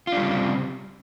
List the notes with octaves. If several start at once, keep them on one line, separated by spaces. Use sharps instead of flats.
C#3 G3 C4 D4 F4